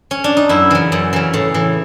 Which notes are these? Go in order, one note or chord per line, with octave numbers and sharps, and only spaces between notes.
C#4
D4
D#4
F#2 E4
C#3 E3
F#2
C#3 E3
A2
E3